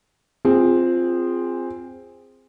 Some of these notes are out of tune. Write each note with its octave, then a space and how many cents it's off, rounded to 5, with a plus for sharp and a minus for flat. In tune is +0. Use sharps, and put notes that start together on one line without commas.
C4 +0 F4 +0 G#4 -15